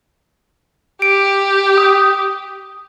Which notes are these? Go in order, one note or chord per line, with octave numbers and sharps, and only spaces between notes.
G4 D7
D#6